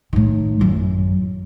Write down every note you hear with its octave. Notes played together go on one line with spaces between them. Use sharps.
A2 D#3
A1 F#2